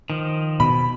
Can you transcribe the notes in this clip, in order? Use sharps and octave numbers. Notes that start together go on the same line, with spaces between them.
D#3 F3
B2 B5